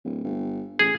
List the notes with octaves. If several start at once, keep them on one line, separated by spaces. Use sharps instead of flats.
D1
G1
A1 G#4